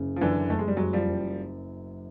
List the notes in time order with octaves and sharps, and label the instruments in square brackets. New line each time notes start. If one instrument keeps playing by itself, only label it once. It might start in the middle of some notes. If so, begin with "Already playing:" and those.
Already playing: [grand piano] F#1 C#3
[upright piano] F3
[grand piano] F#2 [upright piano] D3 E3
[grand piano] F#1 [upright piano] A3
[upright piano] G#3
G3
[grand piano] F#1 [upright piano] F#3 G#3
[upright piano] F3 G3
[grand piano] F#1